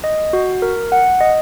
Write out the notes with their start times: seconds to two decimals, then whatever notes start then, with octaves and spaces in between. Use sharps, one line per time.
0.04 D#5
0.33 F#4
0.62 A#4
0.92 F#5
1.21 D#5